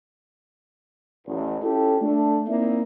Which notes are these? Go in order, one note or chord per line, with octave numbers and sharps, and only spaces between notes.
A1 E2
C#4 E4 F4 G4 A4
A3 D4
A#3 C4 D#4 E4 D5 E5